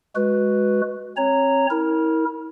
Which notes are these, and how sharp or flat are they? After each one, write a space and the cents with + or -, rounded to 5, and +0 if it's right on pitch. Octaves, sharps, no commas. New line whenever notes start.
G#3 +0 F#4 +0 B4 +0
C4 +40 C#5 +0 A#5 -10
E4 -35 A#4 +0